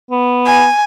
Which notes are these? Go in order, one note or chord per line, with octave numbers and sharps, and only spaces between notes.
B3
G#5